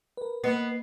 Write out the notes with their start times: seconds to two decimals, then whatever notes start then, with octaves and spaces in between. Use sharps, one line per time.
0.17 A#4 B4
0.44 A#3 B3 D#5 C7